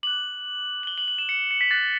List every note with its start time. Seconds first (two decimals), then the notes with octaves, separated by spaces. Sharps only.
0.03 D6 F#6 F#7
0.83 F#7
0.87 G7
0.98 F#7
1.08 F#7
1.18 E7
1.29 C#7
1.51 C#7
1.61 B6
1.71 D6 F#6 A6